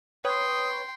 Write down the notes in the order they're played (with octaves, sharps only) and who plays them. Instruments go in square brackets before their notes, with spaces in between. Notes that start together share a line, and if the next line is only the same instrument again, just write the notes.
[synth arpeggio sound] B4 C#5 [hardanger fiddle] G5 C6 [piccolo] D#6